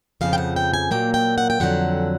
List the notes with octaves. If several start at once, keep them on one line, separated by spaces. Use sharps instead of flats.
F2 C#3 F3 F5
G5
F#5
G5
G#5
A#2 F#3 A#3 G5
G5
F#5
G5
F2 D3 F#3 F#5